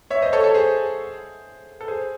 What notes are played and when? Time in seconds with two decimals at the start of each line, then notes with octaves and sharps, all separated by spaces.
0.10 C#5 E5
0.22 C5 D#5
0.33 A4 C#5
0.44 A4 C#5
0.54 G#4 C5
1.81 A4
1.88 G#4 C5